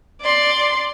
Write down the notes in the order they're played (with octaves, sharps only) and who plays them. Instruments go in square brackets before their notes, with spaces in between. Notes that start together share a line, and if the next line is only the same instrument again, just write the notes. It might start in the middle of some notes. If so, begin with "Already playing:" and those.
[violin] D5 C6